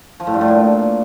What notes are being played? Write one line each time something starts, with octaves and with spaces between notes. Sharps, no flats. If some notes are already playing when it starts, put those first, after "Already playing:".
F3
A2
G2
A2
A#2